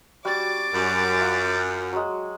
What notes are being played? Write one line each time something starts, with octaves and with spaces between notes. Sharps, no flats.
G3 F#4 D6 A6
F#2
F4 C5
F#3 G#3